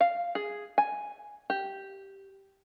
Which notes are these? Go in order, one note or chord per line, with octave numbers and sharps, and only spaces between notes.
F5
G#4
G#5
G4